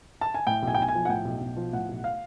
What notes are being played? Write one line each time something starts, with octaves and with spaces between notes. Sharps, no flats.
A5
G#5
A2 G5
B1 G#5
G5
B1 G#5
G#5
F3
F#5
A2 G5
B1
B1
F3
A2 F#5
B1
F5